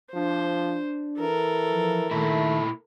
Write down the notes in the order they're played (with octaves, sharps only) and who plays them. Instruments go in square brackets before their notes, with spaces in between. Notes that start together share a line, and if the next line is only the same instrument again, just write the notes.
[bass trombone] F3 [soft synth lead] D4 [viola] C5
[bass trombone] E3 [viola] A4 A#4
[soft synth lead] F3
[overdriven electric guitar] A#2 E4 [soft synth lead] D#3 [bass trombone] A3